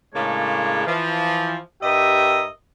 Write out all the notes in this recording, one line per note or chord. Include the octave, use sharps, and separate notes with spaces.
A2 C#3 G#3 A#3 D4 C#5
E3 F3
G2 G4 A#4 D#5 E5